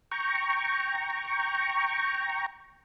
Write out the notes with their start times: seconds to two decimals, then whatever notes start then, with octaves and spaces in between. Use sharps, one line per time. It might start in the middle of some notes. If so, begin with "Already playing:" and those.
0.11 G5 A#5 C#6